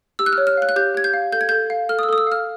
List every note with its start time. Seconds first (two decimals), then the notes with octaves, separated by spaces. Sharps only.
0.19 G4 E6
0.26 F#6
0.33 F6
0.38 C#5
0.47 F6
0.57 F5 F#6
0.69 F#6
0.76 G4 G6
0.94 G4 G#6
1.04 G6
1.13 F5
1.32 A4 G6
1.41 G#6
1.49 A4 G6
1.70 F5
1.89 A4 F6
1.99 D#6
2.03 E6
2.09 A4 D#6
2.18 E6
2.27 F5 F6